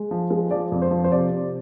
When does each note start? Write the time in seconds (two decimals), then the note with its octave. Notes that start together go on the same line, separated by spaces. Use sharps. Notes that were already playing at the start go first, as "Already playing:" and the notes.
Already playing: G#3
0.11 F3
0.30 G#3
0.51 F3 D5
0.72 F2
0.82 C5
0.91 F3
1.04 C5
1.11 C3 D5
1.31 C3